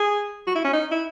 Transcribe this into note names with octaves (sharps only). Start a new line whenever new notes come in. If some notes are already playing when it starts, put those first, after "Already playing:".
Already playing: G#4
F#4
E4
C#4
D#4
E4